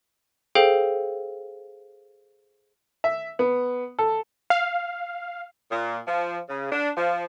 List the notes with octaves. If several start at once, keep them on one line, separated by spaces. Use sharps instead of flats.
G#4 A4 C5 F5 G5
E5
B3
A4
F5
A#2
F3
C#3
D4
F3